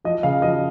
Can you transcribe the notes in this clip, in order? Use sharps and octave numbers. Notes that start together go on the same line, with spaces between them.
F3 D#5
C#3 F5
F3 D#5